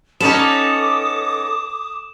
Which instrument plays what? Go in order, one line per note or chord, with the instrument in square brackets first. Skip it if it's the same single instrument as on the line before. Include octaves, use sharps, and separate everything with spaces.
[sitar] B3 C#4 D#4 [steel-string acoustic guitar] A4 [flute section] D6 D#6 [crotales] E7